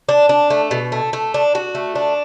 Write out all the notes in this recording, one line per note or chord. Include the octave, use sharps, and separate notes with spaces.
D4
D4
A3
B2
A3
A3
D4
F#4
A3
D4